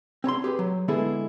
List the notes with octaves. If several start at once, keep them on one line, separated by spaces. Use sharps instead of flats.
C4 C#5 A#5 C6
G4 G#4 B4
F#3
D3 G#3 B3 E4 G#4 A4